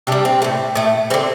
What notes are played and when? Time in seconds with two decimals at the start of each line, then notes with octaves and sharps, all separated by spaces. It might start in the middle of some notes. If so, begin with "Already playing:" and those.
0.07 C3 G3 D4 G4
0.25 C4
0.42 A2 A3
0.75 A2 A3
1.10 D3 G3 C4